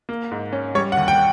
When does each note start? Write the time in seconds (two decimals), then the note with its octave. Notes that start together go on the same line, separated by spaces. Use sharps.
0.09 A#3
0.31 G#2
0.53 C#4
0.75 G3 C#5
0.92 F#5
0.97 D#2
1.08 G5